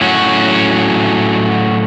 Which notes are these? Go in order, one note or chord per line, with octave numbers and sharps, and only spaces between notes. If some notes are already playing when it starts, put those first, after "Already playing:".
A2 F#3 C#4 F#4